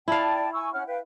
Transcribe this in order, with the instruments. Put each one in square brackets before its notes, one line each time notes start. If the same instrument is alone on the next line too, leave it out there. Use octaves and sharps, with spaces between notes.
[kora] E4 F5 [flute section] D5 G5 A5
[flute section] G#5 C#6 E6
C#4 F#5 F6
B4 F5 G5